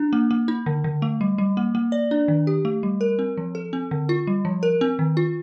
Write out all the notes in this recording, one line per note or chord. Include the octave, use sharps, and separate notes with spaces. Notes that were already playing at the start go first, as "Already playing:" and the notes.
Already playing: D4
A#3
A#3
D#4
D3
D3
A3
G3
G3
A#3
A#3
D5
D4
D#3
G4
A3
G3
A#4
C4
F3
A4
C4
D3
F4
G3
F3
A#4
C4
D#3
F4